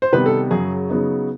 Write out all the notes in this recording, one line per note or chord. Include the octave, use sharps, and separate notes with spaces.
C5
C3 D#3 G3 B3 B4
A4
F#2 C#3 F#3 G#4
C#3 F#3 B3 D#4